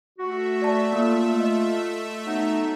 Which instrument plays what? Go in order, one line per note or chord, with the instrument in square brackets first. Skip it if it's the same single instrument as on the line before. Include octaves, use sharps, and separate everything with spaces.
[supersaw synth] A3 E5 [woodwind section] F#4
[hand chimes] D5 A5
[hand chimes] A#3 [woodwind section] F4
[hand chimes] D#5
[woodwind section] F#3 B3 D#4